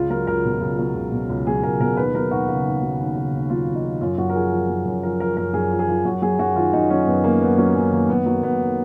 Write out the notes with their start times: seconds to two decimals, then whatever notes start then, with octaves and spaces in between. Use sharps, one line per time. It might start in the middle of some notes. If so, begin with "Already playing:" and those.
Already playing: C#2 F4
0.10 F#3 A#4
0.27 C#2 A#4
0.45 B2
0.61 C#2
0.79 F#3
0.95 C#2
1.12 B2
1.29 C#2
1.46 F#3 G#4
1.63 C#2 A#4
1.80 B2 A#4
1.97 D#2 B4
2.15 F#3 A#4
2.31 D#2 F#4
2.48 C#3
2.65 D#2
2.82 F#3
2.99 D#2
3.16 C#3
3.33 D#2
3.50 F#3 F4
3.68 D#2
3.75 D#4
3.84 C#3
4.01 F#2 F4
4.18 F#2 F#4
4.29 A#4
4.35 F3 G#4
4.52 F3
4.69 F#2
4.86 F#2
5.03 F3 A#4
5.20 F3 A#4
5.37 F#2 A#4
5.54 F#2 G#4
5.71 F3
5.79 G#4
5.88 F3
6.05 F#2 F#4
6.22 F#3 G#4
6.39 F#2 F#4
6.56 D#3 F4
6.73 F#2 D#4
6.90 F#3 C#4
7.07 F#2 B3
7.24 D#3 A#3
7.41 F#2 B3
7.58 F#3 C#4
7.75 F#2 C#4
7.92 D#3 A#3
8.09 F#2 B3
8.26 F#3 A#3
8.43 F#2 B3
8.60 D#3